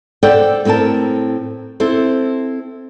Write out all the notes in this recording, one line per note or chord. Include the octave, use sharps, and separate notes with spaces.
A4 C5 D5 F#5 G5
A2 C4 A4 A#4 A5
C4 E4 A4 C5